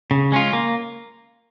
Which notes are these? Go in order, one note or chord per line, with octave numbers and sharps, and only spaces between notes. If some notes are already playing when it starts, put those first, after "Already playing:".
C#3
G#3 C#4 F4
A#3